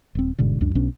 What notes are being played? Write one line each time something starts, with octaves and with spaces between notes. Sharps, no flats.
D#1 C4
G1 G#2 B2 D3
C#2 F#2 D4
B1 B2 C#4 D4